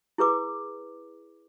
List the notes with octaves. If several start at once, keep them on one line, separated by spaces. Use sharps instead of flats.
E4 G#4 B4 D6